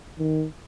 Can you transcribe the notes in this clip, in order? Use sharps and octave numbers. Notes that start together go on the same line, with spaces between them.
D#3